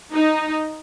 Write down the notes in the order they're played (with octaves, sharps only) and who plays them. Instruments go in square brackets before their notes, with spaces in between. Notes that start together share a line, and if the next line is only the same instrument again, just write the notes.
[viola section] D#4